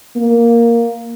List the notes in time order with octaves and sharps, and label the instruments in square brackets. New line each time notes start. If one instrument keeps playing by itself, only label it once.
[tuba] A#3